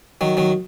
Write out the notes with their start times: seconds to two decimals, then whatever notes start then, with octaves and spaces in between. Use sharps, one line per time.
0.21 D#3 F#3
0.37 D#3 F#3